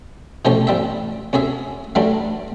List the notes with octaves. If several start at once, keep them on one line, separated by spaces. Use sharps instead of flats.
B2 E3 F3 A3 C#4 G4
A1 G3 E5
D2 C#4 G#4 E5
E3 F#3 G3 A3 D4